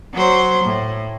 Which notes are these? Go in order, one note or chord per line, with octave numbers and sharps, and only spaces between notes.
F#3 C5
A2